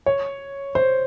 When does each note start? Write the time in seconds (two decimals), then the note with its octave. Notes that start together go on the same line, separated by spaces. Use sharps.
0.06 C#5
0.75 C5